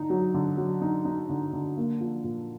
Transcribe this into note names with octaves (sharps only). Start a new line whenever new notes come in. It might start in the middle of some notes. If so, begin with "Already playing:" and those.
Already playing: D3 D#4
F#3
D3
F#3
D#4
D#4
D3
D3
A#3
F3
A#2